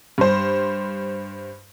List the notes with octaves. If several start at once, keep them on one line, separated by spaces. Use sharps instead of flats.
G2 C5